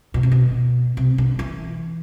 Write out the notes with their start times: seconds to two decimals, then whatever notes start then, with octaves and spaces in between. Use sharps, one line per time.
0.14 B2
0.23 C3
0.32 B2
0.97 C3
1.18 D3
1.39 E3